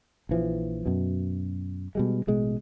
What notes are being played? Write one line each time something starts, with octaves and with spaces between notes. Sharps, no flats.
A#1 E3 F3
F#2 B2
B2 G3 G#3
A1 B2 G#3